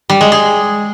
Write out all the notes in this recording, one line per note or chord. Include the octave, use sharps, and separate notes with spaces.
G3
G#3
G#4